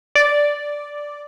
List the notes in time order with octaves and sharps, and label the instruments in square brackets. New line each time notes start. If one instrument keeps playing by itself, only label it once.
[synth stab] D5